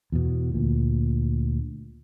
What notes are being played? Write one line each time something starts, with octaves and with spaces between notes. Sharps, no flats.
E2 B2
D2 A#2